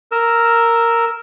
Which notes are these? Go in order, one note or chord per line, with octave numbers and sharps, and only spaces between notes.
A#4 E6